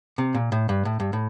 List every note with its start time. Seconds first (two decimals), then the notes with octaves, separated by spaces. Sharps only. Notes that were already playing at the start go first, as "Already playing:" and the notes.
0.18 C3
0.34 A#2
0.52 A2
0.69 G2
0.85 A2
1.00 G2
1.13 A2